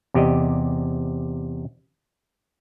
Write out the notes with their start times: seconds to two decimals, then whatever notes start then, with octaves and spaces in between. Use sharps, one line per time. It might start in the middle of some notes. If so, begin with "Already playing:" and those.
0.14 E2 C3 G4 D5 D#5